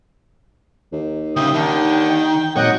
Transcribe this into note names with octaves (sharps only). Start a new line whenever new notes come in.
D#2
D2 C#3 E5 G5 D#6
D3 D#3
G#1 A#2 F#3 C#5 D#5 F#5 G5